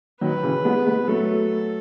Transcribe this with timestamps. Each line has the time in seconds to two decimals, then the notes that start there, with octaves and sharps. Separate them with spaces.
0.21 D#3 F#3 B4
0.43 C#3 E3
0.65 G#3 B3
0.86 G#3 B3
1.08 F#3 A3 A4